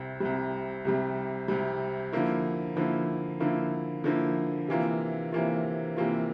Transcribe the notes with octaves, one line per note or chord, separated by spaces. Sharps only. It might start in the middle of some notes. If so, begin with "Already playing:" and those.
Already playing: C2 C3 G3
C2 C3 G3
C2 C3 G3
C2 C3 G3
D3 F3 A#3 E4
D3 F3 A#3 E4
D3 F3 A#3 E4
D3 F3 A#3 E4
C3 E3 A#3 F4
C3 E3 A#3 F4
C3 E3 A#3 F4